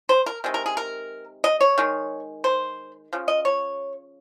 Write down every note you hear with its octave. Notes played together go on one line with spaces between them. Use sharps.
C5
A#4
C3 D#3 G#3
A#4
G#4
A#4
D#5
C#5
D#3 G#3
C5
C#3 F3
D#5
C#5